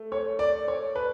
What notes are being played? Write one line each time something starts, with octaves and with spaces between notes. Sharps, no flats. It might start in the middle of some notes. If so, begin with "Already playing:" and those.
Already playing: A3
C#5
D5
C#5
B4